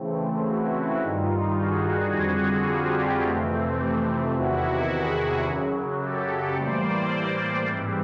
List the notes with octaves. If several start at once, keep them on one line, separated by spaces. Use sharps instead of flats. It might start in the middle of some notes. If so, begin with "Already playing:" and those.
Already playing: C#3 E3 A3 C4
E4 F#4
G2 D#3 G3 D#4 F4
F#4 G#4
F2 D3 G3 C4 F#4 G#4
F4 G4
F2 C3 E3 A3 C4
E2 C3 D#3 E4 F#4
F#4 G#4
F#2 C#3 F#3
G4 A4
A2 E3 G3 A#3 C5 D5
G#2 E3 G3 C4